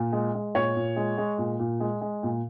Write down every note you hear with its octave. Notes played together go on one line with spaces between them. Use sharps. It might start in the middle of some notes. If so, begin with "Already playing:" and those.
Already playing: A#2
G#3
G#3
A#2 C#5
A#2
G#3
G#3
A#2
A#2
G#3
G#3
A#2